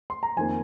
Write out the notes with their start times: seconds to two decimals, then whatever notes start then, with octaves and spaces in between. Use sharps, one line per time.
0.10 C6
0.23 A#5
0.36 F2 D#3 A#3 G#5